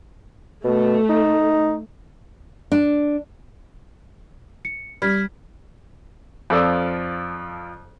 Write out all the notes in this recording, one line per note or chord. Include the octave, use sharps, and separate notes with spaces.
B2 A3
D#4
D4
C#7
G3 F6 G#6 B6
F2 F3 F4 A4 D5 E6